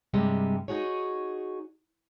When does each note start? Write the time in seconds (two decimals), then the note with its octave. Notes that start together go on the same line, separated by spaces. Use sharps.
0.14 G2 C3 G3 G#3
0.68 D#4 F#4 G#4 C#5